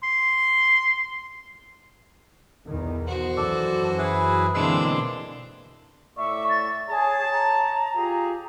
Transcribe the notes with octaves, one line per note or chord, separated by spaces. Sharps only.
C6
B1 E2 D#3
F#4 C5
F#2 E3 A4 D5
E4 G#4 B4
B2 D3 E3 G#3 A#3 C4 D4 E6
A2 D5 E5 C#6
A6
G#4 C#5 A5
A#5
F4 G4 G#4